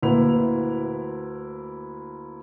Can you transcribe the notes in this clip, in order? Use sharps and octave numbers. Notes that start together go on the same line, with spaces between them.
D2 A#3 E4 B4 F7